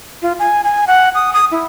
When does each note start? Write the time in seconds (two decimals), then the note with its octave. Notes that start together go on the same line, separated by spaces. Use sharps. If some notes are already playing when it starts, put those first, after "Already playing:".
0.22 F4
0.39 G#5
0.64 G#5
0.87 F#5
1.15 D#6
1.33 D#6
1.51 E4